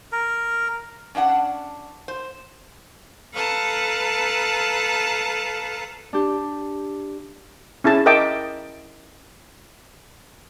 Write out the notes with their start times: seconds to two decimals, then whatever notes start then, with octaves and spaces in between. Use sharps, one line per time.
0.12 A#4
1.15 C#4 D4 E5 F#5
2.08 C5
3.34 A4 B4 F5 A5 A#5
6.13 D4 G4
7.84 C#4 E4 G#4 A5
8.06 A#4 D#5 E5 G5 A5 D6